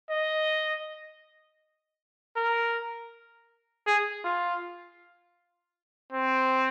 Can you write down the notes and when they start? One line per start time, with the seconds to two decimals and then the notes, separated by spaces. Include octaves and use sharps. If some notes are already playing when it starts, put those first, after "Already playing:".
0.10 D#5
2.36 A#4
3.87 G#4
4.24 F4
6.13 C4